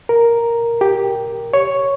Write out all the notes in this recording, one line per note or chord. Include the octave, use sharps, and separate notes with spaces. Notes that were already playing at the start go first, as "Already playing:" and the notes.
A#4
G4
C#5